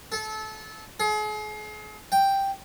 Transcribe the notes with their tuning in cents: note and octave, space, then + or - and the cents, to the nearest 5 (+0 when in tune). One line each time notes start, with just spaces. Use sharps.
A4 -25
G#4 +40
G5 +0